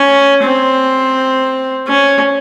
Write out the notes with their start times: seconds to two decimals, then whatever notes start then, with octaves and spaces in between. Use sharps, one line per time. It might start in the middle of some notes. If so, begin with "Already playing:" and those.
Already playing: C#4
0.44 C4
1.87 C#4